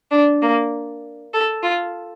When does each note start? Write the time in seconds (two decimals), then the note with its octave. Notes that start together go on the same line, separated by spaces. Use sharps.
0.11 D4
0.42 A#3
1.34 A4
1.63 F4